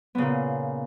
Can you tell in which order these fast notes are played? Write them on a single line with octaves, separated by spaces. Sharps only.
B3 C#3 A#2